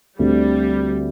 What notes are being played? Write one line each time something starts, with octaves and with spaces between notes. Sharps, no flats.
D2 D3 G3 A3 C4